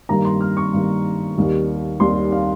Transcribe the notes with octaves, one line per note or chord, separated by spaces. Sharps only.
G2 D#3 G3 A#3 A#5
C6
F6
C#6
G2 D#3 G3 A#3
D#2 D#3 G3
D#2 D#3 G3 C6
F5